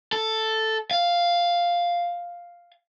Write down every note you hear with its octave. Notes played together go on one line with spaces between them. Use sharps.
A4
F5